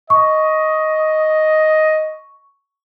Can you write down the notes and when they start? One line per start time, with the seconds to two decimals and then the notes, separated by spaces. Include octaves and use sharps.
0.10 D#5 C#6